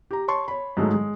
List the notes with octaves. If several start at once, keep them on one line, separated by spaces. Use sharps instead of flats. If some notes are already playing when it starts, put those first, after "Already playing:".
G4 A#5
C#5 A5 C6 C#6
C#5 B5
G#2 F#3 G#3 A3
G#3